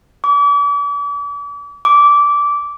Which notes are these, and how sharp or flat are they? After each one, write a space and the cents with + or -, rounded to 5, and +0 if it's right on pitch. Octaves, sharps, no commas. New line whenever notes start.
D6 -40
D6 -15